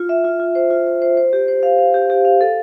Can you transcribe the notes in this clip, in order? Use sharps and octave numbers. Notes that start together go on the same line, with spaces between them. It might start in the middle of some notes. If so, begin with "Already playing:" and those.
Already playing: F4
E5
F4
F4
C5
F4
C5
C5
C5
G4
C5
F5
F5
G4
G4
F5
A4